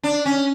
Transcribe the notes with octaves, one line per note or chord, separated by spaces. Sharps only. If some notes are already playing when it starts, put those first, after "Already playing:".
D4
C#4